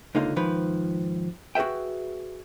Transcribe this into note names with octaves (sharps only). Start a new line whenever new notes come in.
C#2 D3 A#3 D#4 F4 F5
G#2 D#3 F3 B4
F#4 G#4 B4 E5 G5